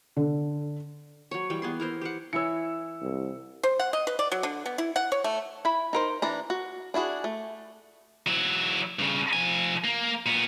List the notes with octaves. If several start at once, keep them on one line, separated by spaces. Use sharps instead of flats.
D3
F#3 C#5
E3 G3 G5
B3 G#4 C6
E4 A#4 C5
G4 C5 F#5
E3 E4 C#5 E6 C#7
C2
C5
F#5
D#5
B4
D5
F#3
D3
B3
E4
F#5
C#5
A3
E4 B5
D#4 A#4 C5
E3 D4 A#5
F#4
D4 E4 F#4 G#4
A3
F#3 E4
G2 C#3
F3 G#5
A#3
A#2 B3